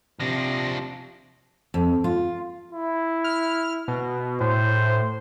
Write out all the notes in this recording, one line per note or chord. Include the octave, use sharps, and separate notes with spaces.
C3 F3 D4 A#6
F2
F4
E4
F6
B2
A2 C5